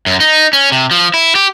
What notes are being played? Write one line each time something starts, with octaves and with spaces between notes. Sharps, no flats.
F#2
D#4
C#4
C3
F3
E4
G4